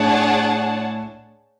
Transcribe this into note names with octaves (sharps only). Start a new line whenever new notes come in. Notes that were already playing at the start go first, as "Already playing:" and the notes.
Already playing: A2 D4 G#4 C#5 F#5 A5